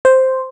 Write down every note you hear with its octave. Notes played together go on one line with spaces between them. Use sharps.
C5